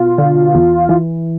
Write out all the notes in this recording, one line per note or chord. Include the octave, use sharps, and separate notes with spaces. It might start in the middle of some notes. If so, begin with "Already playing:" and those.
Already playing: B2 F4
D3
E2
E3